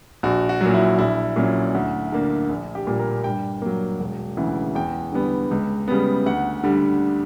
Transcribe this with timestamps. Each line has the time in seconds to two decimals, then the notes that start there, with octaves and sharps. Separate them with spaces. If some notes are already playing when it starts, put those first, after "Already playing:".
0.23 A#1 F#4
0.49 F#4
0.61 F#3
0.66 A#2
0.74 E4
0.99 A#1 E4
1.36 A#2 F#3 C#4
1.75 D2
2.12 D3 A#3
2.49 A#1
2.75 G4
2.87 A#2 G3 A#3
2.99 A#4
3.24 G2 G5
3.62 F#3 A#3
4.00 E1
4.37 D2 C#3 E3
4.75 E2 G5
5.12 D3 G3 B3
5.51 C#2
5.88 C#3 G3 B3
6.26 D2 F#5
6.64 D3 G3